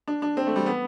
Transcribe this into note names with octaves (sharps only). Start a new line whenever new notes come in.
D4
D4
C4
A3
G3
B3